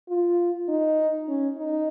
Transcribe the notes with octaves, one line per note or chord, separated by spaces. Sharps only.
F4
D#4
C#4
D#4